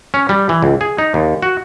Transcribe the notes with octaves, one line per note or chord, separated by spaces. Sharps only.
C#4
G3
E3
C#2
G#4
D#4
D#2
F#4